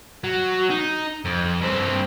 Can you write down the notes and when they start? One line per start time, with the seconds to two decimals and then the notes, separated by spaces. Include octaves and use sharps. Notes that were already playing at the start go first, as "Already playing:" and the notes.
0.24 F#3
0.70 D#4
1.25 F2
1.61 G2 C4